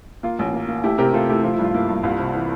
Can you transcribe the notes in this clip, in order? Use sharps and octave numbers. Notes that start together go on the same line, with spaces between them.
A#3 F4
A1
A#3
A#3
A3 E4 G4
C3 G4 A#4
A3 F4 A4
A3 E4 G4
F3 F4
E4
G2
F4
A#3 E4
G2
C2 F4
C3
E3